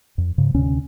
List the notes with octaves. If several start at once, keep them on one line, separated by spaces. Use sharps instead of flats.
F2
G#2 C#3
D2 C3 C#4